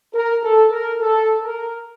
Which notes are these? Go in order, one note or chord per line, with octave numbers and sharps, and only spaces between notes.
A#4
A4
A#4
A4
A#4